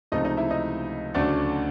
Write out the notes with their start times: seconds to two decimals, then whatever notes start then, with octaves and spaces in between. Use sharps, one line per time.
0.12 C#2 C3 F3 A3 D#4 D#5
0.24 D#4 D#5
0.37 E4 E5
0.50 D#4 D#5
1.14 D2 C#3 F#3 A3 D4 D5